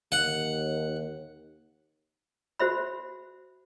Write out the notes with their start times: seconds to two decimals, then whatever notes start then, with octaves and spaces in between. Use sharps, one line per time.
0.12 D#2 F#5
2.59 F#4 C5 E5 B5